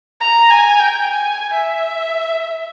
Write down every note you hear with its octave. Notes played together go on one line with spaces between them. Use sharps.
A#5
G#5
G5
G#5
E5